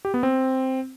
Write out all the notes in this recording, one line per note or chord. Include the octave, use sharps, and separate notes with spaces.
G4
B3
C4